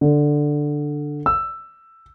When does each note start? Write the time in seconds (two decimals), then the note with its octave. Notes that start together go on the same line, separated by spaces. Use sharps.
0.01 D3
1.26 E6